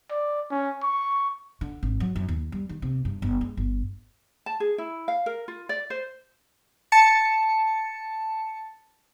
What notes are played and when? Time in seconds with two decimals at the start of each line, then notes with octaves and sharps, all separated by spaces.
0.11 D5
0.51 C#4
0.83 C#6
1.61 D3
1.83 G#1
2.00 F#3
2.16 F#2
2.29 D#2
2.52 G3
2.69 D#3
2.82 C3
3.05 G2
3.22 G1
3.41 G#3
3.57 G1
4.46 A5
4.60 G#4
4.78 E4
5.08 F5
5.26 A#4
5.48 F4
5.69 D5
5.90 C5
6.92 A5 C#7